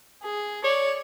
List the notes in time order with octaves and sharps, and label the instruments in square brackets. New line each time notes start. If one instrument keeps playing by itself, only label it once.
[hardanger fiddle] G#4
[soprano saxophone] C#5 [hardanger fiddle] D5